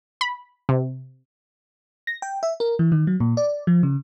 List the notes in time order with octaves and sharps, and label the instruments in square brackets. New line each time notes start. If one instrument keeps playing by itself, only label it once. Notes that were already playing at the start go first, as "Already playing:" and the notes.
[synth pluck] B5
C3
[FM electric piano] A#6
G5
E5
A#4
E3
D#3
F#3
A#2
D5
F3
C#3